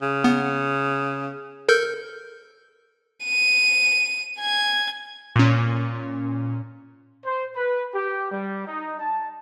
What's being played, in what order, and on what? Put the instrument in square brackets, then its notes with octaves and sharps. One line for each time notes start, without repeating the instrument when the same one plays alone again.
[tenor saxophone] C#3
[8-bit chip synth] B3
A4 A#4 G6
[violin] D#7
G#5 G#6
[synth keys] A#2 C#4
[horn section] C5
B4
G4
G3
D#4
A5